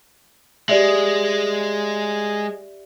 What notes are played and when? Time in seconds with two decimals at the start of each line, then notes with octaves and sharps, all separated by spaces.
0.69 G#3 G4 D5 E5